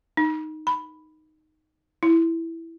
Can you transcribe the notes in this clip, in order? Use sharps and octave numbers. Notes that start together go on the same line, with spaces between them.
D#4
B5
E4